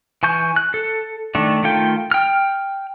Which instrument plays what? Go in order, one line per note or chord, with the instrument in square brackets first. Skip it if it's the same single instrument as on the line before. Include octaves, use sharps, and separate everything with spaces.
[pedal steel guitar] E3 G#5 C#6 G6
F#6
A4
D#3 A3 D4
D#3 A3 F4 G5
G5 F6